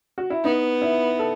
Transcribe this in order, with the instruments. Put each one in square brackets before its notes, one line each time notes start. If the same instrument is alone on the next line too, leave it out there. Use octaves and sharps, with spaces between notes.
[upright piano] F#4
E4
[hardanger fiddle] B3 [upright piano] D#4
[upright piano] E4
A4